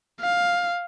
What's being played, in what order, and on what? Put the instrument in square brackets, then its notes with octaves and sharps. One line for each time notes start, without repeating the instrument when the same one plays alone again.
[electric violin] F5